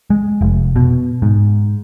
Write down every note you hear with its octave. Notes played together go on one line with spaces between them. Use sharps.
G#3
F1
B2
G#2